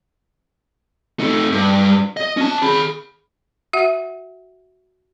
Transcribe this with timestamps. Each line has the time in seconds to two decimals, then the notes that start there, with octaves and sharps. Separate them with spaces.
1.19 A3 D#4
1.52 G2
2.17 D#5
2.37 C#4 A5
2.62 G#4 B5
3.73 F#4 E5 F#5